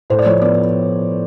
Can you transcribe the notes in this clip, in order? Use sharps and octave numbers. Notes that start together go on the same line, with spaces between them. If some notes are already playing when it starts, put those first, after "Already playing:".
A2 C5
D5
F3 C#5
B3 D5